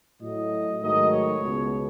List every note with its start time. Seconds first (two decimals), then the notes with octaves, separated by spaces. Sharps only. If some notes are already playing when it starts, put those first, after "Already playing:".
0.21 A2 F#3 A3 D#5
0.81 G#2 D#3 F#3 A3 D#5
1.11 C#5
1.40 C#2 B2 G#3 B3